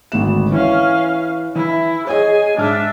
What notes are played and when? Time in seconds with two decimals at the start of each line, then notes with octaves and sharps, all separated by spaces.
0.12 G#1 D2 E7
0.52 E3 C#4 F5
1.55 E3 E4
2.07 G#4 C#5 D#5 G#5
2.58 G#2 D4 E5 F6